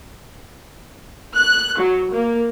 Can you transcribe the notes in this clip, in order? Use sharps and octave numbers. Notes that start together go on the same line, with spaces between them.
F#6
F#3
A#3